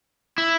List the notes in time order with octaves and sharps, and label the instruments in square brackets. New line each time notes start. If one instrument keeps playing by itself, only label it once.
[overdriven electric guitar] E4